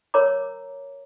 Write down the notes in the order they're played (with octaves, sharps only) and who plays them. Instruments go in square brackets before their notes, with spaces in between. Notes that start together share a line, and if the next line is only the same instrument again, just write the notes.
[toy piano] A#4 C#5 A#5 D6